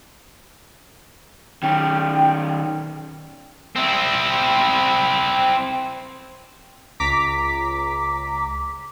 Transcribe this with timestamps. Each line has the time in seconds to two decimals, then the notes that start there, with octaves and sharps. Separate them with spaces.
1.63 D#3 C#4 G5
3.76 C4 E4
7.00 C#2 A#5 D6 B6